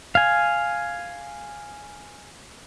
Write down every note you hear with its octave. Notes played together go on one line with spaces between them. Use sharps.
F5 G#5